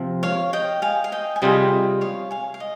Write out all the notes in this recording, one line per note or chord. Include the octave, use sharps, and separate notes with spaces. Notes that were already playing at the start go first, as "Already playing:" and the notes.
Already playing: C3 F3 C4 F4
C#5 F5
D#5 G5
F5 G#5
F5
D#5 G5
G#5
C3 G3 C4 F4 G#4 D#5 G5
C#5 F5
F5 G#5
F5
D#5